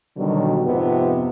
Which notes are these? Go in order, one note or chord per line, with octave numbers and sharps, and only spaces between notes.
B2 D3 D#3 F#3 G3
F2 G#2 C3 F3 B3